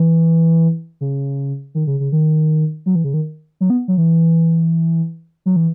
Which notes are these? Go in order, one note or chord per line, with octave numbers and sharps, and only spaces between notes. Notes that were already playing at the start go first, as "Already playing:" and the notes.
Already playing: E3
C#3
D#3
C#3
C#3
D#3
F#3
E3
C#3
D#3
F#3
B3
F#3
E3
F#3
E3